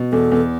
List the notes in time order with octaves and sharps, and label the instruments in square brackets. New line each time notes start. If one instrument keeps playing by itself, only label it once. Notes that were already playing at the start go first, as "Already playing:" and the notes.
Already playing: [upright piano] B2
[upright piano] E2 [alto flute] A4
[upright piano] E2